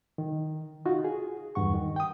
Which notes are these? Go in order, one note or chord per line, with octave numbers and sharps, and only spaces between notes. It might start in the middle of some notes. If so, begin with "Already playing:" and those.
D#3
D#4 F4 F#4
G#4
E2 G2 F#5 C#6
D#3
G5 D#6